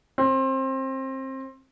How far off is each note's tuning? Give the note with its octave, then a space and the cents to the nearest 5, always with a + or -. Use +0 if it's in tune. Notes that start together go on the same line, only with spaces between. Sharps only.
C4 +25